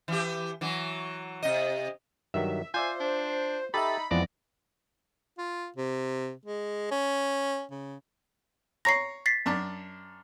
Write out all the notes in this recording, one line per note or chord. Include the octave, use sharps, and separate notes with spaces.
E3 G4
E3 F#3
C3 D#5
G2 D#3 F#3 E5
F4 C5 D5 E5 G#5
D4
D#4 G4 A4 E5 B5 A6
F2 E3 F3 G#3 B3 D5 A#6
F4
C3
G#3
C#4
C#3
C#5 A#5 A#6 C7
A6 B6 C7
F#2 D4 A5